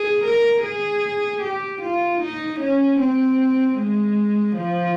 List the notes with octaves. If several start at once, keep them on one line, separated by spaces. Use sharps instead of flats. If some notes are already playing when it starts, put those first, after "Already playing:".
Already playing: G#4
A#4
G#4
G4
F4
D#4
C#4
C4
G#3
F3